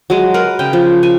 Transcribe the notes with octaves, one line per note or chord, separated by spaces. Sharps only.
F#3 G#3
A#4 B4 F5
C#3 G5
F3
G#5